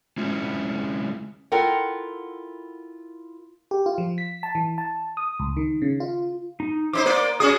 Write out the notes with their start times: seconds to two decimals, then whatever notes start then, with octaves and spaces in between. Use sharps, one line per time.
0.18 G#3 C#4 E4 F4
1.52 E4 F4 A4 A#4 F#5 G5
3.71 G4
3.86 F4
3.98 F3
4.18 B6
4.43 A5
4.55 E3
4.78 A5
5.17 D#6
5.40 C#2
5.57 D#3
5.82 C#3
6.00 F4
6.60 D#4
6.93 F3 D#4 C5 C6 D6
7.06 A#3 C5 D5
7.40 C#4 E4 F#4 G#4 D#5 D#6